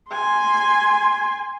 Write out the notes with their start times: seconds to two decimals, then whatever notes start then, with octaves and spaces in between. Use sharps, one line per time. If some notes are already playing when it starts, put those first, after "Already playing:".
0.12 G#5 C6